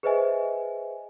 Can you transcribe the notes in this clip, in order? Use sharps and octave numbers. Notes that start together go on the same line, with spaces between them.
G#4 B4 C5 D#5 E5 G#5